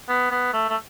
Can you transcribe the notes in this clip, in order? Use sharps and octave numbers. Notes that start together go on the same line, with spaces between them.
B3
B3
A3
A3